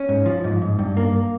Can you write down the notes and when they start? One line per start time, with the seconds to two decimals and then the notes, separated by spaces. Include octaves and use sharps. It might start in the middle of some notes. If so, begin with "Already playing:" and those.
Already playing: C#4
0.09 G#2
0.26 F3
0.44 G#2
0.62 G#2
0.79 G2
0.97 A#3